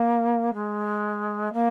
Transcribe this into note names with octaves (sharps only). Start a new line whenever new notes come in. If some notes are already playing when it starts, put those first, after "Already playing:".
Already playing: A#3
G#3
A#3